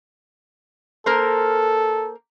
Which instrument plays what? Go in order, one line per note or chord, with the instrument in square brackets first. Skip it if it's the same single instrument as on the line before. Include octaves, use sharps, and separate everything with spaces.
[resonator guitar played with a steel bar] A#3 A#4 C5 [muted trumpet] A4